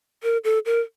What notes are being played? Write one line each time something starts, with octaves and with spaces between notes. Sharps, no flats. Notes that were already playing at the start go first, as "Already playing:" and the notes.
A#4
A4
A#4